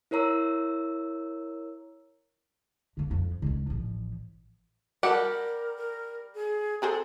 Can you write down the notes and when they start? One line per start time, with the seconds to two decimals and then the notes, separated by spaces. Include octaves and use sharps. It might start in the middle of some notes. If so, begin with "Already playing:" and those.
0.11 E4 A#4 C#5 A#5 E6
2.97 D3 A#3
3.11 F2
3.42 C#2 C#4
3.67 A1 F3
5.03 G3 F#4 G4 A4 A#4 F#5
5.77 A#4
6.35 G#4
6.82 C4 G#4 A4 C5